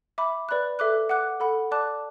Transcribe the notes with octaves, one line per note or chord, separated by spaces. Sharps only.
E5 B5 D6
B4 D5 B5 F#6
A4 E5 D6 F#6
F#5 D6 F#6
A4 F#5 B5
D5 A5 D6 F#6